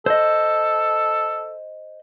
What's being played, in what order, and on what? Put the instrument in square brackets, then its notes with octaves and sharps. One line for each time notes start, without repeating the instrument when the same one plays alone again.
[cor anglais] A4 [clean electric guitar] C5 D#5